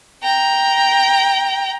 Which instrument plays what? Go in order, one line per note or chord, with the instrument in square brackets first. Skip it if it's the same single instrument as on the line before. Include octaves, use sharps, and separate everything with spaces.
[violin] G5 A#5